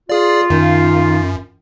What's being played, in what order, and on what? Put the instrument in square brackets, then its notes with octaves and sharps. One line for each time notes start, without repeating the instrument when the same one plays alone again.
[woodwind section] F4 [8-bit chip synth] G#4 D5
[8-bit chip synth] F#2 [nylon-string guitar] D#3